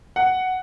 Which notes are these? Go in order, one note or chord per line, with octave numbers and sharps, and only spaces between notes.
F#5